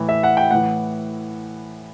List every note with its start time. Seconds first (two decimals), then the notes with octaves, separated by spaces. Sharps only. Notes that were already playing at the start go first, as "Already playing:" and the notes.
Already playing: A2 E3
0.09 E5
0.23 F#5
0.37 G5
0.51 A2 E3 F#5